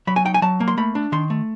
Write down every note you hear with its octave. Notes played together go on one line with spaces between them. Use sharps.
F#3 B5
G#5
D#4 G5
G#5
F#3 A5
A#3
C6
A3 B5
D4
D#3 C6
A3